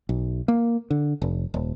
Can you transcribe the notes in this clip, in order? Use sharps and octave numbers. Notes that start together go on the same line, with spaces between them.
B1
A#3
D3
F1
D#1